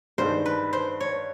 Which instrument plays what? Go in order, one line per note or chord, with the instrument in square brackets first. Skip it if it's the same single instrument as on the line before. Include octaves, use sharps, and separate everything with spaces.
[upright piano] G2 D#3 G#3 [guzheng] C5
[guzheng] B4
C5
C#5